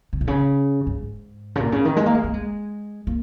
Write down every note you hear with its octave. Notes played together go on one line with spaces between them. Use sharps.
C#3
A#2
C#3
G#2
C#3
A#2
C#3
D#3
G#3
A#3
G#3
A#3
G#3
A#3